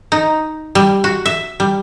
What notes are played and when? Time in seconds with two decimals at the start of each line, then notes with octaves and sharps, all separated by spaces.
0.12 D#4
0.75 G3
1.04 F#4
1.26 E5
1.60 G3